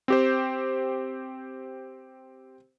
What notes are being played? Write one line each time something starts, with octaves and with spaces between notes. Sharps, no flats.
C4 G4 C5